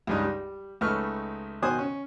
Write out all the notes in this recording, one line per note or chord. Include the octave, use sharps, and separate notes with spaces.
C#2 G2 D#4
G3
C#2 A3 D#4 B4 C#6 F6
B2 D#3 C5 G#5 D#6 F#6
C#4